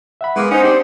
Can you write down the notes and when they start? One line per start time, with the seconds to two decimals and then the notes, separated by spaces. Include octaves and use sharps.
0.21 E5 F#5 B5
0.36 E3 G#3 A#3 B3 C6 D6
0.51 C#4 D#4 C5 F#5
0.63 C4 D4 D#4 G4